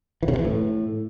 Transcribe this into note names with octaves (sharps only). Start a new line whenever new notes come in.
E3
C#3
C3
E3
A2